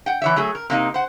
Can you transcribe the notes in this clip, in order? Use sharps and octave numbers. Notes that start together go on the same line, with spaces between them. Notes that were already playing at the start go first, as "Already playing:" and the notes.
F#5 G5
E3 C#5 E5
F#3 A3 G#4
A#4
C3 A#3 D#4 D#5
C5 F#5